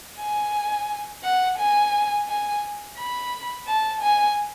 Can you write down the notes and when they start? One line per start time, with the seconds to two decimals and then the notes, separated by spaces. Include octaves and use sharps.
0.20 G#5
1.24 F#5
1.59 G#5
2.28 G#5
2.98 B5
3.67 A5
4.02 G#5